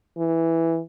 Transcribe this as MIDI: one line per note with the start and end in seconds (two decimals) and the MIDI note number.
0.18 0.80 52